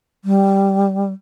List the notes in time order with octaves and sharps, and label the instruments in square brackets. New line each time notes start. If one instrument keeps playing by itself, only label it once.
[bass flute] G3